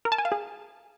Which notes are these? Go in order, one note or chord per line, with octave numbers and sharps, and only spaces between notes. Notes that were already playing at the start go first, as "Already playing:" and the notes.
A#4
A5
G#5
F5
G#4